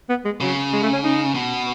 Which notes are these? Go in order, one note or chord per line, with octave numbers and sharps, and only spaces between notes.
B3
G#3
C#3 F#3
G#3
A3
C#4
D#4
B2